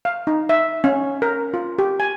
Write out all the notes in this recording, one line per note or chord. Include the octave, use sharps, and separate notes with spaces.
F5
D#4
E5
C#4
A#4
F4
G4
G#5